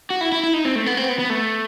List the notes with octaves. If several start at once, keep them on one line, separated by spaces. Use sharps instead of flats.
F#4
E4
E4
E4
D#4
C4
A3
B3
C4
B3
B3
A3